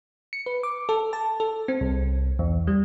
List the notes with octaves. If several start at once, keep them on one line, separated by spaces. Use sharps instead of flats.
C#7
B4
D6
A4
A5
A4
C4
C2
E2
G3